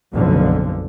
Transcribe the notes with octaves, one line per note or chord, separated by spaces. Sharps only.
F#1 B1 F2 G#2 D3 F3